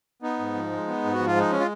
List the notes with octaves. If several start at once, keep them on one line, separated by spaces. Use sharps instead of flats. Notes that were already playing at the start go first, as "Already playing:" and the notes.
B3 D#4
G#2
F3
G#3
B3
G#2
F#4
F3
F4
G#3 D#4
C#4
F4